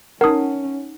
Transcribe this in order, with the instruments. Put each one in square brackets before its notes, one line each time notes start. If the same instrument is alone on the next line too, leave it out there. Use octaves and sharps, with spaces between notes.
[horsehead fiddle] C#4 [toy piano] D#4 F#5 [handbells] A#4 D#6